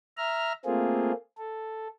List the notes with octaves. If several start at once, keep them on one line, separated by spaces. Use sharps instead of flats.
E5 A#5 F6
A3 A#3 C4 F4 G#4
A4